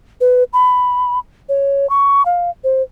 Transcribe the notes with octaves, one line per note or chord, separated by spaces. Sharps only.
B4
B5
C#5
C#6
F5
C5